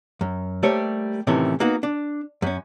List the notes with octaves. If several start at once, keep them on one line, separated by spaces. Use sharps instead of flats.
F#2
G3 A3 A#3 G4 C5 C#5
A2 C3 D#3 E3 A3 C#4
A#3 B3 D#4 F#4
D4
F#2 C#4